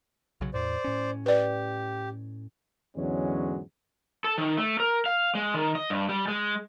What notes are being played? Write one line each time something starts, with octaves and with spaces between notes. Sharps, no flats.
B1 C#3 F#3
E2 A2 C5 D5
A2 C#4
G4 B4 D5
E2 G#2 D3 F#3 G#3 C#4
A4
D#3
A3
A#4
F5
G#3
D#3
D#5
G2
G3
G#3